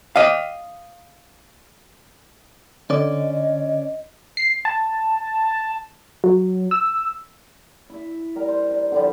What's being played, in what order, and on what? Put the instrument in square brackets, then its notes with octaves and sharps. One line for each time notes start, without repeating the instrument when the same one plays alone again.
[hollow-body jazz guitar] D#5 F5
[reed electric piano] D3 [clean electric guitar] C#4 D5 [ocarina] D#5
[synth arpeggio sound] C7
A5
F#3
E6
[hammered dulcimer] E4 E5
G3 A#4
C5
D4
D3 F3 G3